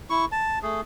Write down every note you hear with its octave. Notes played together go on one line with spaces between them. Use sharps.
E4 C#6
A5
A3 G#4